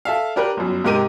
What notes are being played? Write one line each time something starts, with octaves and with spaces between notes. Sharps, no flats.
A4 E5 F5
D4 G4 A#4 B4
G1 F#2
G#2 C3 G4 A#4 D6 D#7